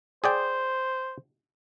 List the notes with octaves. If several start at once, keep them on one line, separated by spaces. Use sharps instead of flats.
G#4 C5 D5 G5